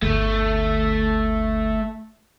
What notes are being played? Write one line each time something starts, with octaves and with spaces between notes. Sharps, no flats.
G1 D2 A3